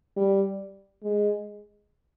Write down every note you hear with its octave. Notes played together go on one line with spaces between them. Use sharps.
G3
G#3